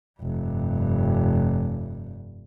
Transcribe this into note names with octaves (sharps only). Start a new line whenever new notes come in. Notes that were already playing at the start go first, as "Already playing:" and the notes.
F1 G2